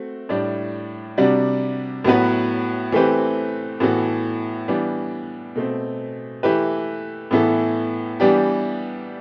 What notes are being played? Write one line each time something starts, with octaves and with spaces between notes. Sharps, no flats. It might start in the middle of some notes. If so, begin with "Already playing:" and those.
Already playing: A3 C4 F#4
A2 G3 D4
C3 G3 D4 F#4
A2 F#3 B3 F#4 B4
E3 A3 C4 G4 B4
A2 E3 B3 F#4 A4
E3 G3 B3 D4
B2 A3 C4
E3 A3 E4 G4 B4
A2 E3 B3 E4 A4
E3 G3 B3 D4 G4